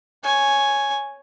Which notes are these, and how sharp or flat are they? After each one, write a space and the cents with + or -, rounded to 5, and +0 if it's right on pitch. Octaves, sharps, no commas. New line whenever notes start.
C#5 +0 G#5 +0